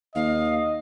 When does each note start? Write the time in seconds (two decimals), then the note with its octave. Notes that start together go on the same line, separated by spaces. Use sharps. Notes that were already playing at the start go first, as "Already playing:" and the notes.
0.15 D#2 D#5 F5